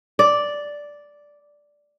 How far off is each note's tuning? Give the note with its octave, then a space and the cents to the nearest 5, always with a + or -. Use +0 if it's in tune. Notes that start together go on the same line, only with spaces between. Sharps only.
D5 -5